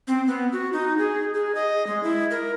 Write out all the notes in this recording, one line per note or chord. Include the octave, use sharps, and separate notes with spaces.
C4
B3
F#4
D#4
G#4
G#4
D#5
G#3
E4
A#4